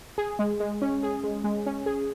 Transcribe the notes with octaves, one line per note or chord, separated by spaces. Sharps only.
G#4
G#3
G#3
C#4
G#4
G#3
G#3
C#4
G#4